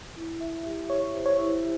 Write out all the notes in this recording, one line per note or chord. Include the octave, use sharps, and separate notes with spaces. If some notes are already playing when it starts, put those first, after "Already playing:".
E4
E5
G4
C#5 E5
C5
C#5
E4